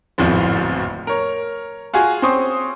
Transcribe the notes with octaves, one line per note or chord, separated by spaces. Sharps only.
D1 G#1 F2 A2 F3 B3
A#4 C#5
F4 F#4 G#4 G#5
C4 C#4 C5 C#6 D#6